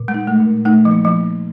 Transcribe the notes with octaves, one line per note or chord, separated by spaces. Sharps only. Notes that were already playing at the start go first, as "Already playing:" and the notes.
Already playing: A#2
G#3
D#4
A3
A#2
A3 D#4
F3
A#3
F3